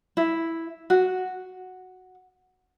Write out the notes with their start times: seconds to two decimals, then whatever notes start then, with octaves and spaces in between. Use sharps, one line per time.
0.17 E4
0.90 F#4